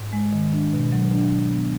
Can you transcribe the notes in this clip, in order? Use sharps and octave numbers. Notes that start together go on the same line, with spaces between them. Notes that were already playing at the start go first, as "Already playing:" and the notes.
Already playing: G#2
G#3
D#3
D4
B2
F#3
D4
B2
B3